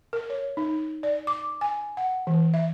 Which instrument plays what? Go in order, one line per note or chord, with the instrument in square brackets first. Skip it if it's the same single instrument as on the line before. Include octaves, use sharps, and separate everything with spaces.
[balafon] A#4
C#5
D#4
D5
D6
G#5
F#5
E3
E5